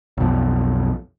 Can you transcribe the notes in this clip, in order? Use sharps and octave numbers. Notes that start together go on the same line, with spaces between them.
B1 F2